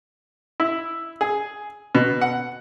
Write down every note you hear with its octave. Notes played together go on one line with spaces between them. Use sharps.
E4
G#4
B2
F#5